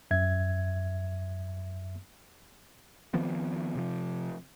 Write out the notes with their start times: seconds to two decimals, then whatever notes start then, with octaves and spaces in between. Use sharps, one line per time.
0.11 F#2 E5 G#6
3.14 D#3 F3 B3 C4
3.75 C3 F3